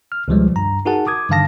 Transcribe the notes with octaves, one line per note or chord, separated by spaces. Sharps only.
F6
C#2 B2 D#3 F3 G3 G#3
G2 A#5
D#4 F#4 G#4 A#4 F#5 A5
D6 D#6 G#6
G2 D3 D#3 F5 A5 A#6